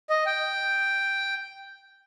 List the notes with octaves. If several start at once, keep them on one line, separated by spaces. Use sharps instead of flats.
D#5
G5